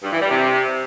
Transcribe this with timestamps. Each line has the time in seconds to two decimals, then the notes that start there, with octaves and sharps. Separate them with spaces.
0.04 G2
0.13 E3
0.22 G3
0.31 C3